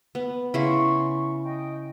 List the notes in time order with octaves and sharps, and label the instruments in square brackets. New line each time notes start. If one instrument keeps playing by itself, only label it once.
[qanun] B3
[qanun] C#3 E4 [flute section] C6 C#6
[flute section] D#5 G5